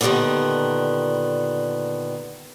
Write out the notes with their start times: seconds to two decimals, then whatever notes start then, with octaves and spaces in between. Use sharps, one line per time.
0.01 A#2 D3 D#3 G3 A#3 B3